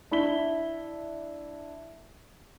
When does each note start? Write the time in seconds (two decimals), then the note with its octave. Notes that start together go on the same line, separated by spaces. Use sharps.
0.11 D4 E4 E5 B6 G7